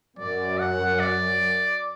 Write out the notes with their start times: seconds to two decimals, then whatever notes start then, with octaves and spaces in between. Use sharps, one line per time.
0.18 F#2 D5
0.59 F#5
0.99 D5